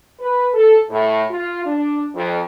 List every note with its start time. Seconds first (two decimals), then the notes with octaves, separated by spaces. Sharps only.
0.19 B4
0.54 A4
0.90 A2
1.30 F4
1.66 D4
2.15 F2